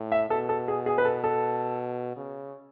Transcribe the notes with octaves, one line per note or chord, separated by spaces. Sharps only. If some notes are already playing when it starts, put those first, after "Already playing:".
Already playing: A2
E5
B2 A4
A4
G#4
G#4
B4
A4
A4
C#3